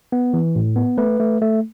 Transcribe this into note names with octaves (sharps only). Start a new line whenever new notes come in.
B3
E3
A2
B3
A3 B4
A3
A3